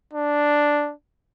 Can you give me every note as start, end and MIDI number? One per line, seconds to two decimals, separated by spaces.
0.13 0.93 62